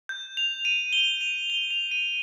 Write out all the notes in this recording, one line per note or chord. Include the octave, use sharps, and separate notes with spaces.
G6
F7
D#7
G7
F7
G7
F7
D#7